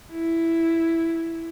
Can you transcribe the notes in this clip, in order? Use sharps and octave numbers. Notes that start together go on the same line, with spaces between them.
E4